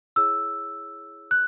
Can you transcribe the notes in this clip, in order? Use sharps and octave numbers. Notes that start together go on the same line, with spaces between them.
E4 G#4 C#5 E6
F#6